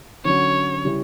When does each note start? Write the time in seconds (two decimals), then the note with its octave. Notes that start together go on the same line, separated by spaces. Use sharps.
0.25 D3 F#3 C#4 C#5
0.85 C#3 G3 C#4 E4